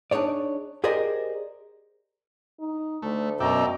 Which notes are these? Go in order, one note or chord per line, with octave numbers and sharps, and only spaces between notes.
D4 D#4 G#4 C#5 D5
G4 G#4 A#4 C5 D5 D#5
D#4
D2 A3
F#2 B2 D5 E5 G5 A#5